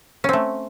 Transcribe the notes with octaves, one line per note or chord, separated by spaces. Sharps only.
A3 C4 C#4